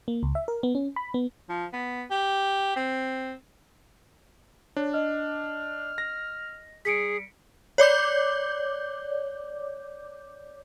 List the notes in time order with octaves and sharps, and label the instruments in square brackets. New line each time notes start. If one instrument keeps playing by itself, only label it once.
[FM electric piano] A#3
C#2
E5
A#4
B3
C#4
B5
B3
[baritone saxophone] F3
B3
G4
C4
[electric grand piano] D4 [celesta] C#5
[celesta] D#5 [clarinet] F6
[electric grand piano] A#6
[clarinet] G3 [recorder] G#4 [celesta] B6 C#7 D7
[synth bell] C#5 D5 D6 G6